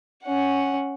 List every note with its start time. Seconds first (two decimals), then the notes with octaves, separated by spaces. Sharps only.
0.24 C#4 F#5